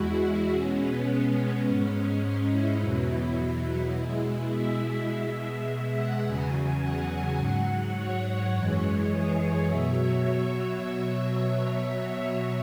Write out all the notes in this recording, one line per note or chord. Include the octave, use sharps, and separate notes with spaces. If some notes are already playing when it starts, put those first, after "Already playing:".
Already playing: E2 E3 G#3 E4 F#4
B2 G#3 C#4
B3
C#4
G#2 G#3 C#4
C#4
E4
E2 B2 F#3 E4
B2 G#3
E5
B2 G#3
E5
F#5
E2 C#3 F#3 G#5
F#5
G#2 F#3
C#5
F#2 E3 G#3
G#4
C#5
B2 F#3 E5
C#5